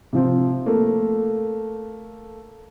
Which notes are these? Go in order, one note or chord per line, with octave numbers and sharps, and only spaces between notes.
C3 F3 C4
A3 A#3